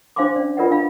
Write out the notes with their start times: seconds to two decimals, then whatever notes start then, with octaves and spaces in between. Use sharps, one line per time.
0.16 D4 C5 F5 G#5 C6 D6
0.35 C#4 D5 F5
0.57 F4 A#4 B4 D5 D#5 F#5
0.71 D4 F5 B5